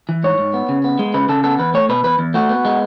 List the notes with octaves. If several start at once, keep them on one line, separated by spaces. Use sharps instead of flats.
E3
G#2 C#5
G#2
B3
C#3
B3
G#3
C#3 B4
C#3 A4
B3 A4
E2 B4
A3 C#5
B2 B4
E2 B4
E2
A3 F#4
B3
G#3